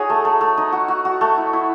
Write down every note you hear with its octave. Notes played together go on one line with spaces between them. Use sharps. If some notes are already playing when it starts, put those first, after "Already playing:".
Already playing: D#4 F#4 G#4 C#5
A3
A3
A3
D#4
F#4
F#4
F#4
A3
E4
E4